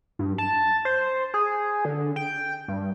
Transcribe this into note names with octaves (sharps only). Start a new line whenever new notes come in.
G2
A5
C5
G#4
D3
G5
G2